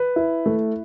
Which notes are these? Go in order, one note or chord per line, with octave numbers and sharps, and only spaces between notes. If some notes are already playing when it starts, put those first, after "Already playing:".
Already playing: B4
E4
A3